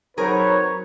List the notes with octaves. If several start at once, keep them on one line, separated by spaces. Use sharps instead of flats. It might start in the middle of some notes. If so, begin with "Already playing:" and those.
F#3 C4 D#4 G#4 A#4 B4 C#5